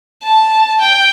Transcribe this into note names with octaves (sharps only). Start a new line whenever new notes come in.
A5
G5